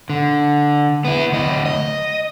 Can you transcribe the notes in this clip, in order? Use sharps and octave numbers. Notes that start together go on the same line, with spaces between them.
D3
B3 E4
D2 D#5
D#5